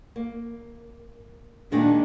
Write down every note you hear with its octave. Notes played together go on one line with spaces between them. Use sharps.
A#3
A#2 D#3 G#3 D4